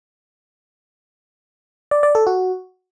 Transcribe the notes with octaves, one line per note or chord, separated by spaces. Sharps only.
D5
D5
A4
F#4